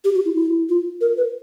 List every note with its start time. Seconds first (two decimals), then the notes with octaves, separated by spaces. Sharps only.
0.05 G4
0.15 F#4
0.25 E4
0.36 E4
0.69 F4
1.01 A#4
1.17 B4